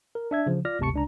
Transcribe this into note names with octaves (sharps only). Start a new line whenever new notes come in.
A#4
D4 E5 G#6
C#3 F3
F4 D5 F6 A#6
G1 D2 C3 A5 C#6 C#7
C#2 D4 A#5